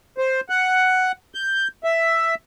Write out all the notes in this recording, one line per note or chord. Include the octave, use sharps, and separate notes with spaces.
C5
F#5
G6
E5